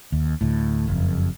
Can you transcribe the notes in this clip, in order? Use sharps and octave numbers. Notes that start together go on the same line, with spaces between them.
D#2
D2 A2
F#1 F2